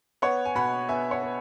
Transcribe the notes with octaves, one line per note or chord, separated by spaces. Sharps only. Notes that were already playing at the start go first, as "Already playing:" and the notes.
B3 C#5 F#5
G#5
B2 F#5 B5
B3 E5 G#5
C#5 F#5
B3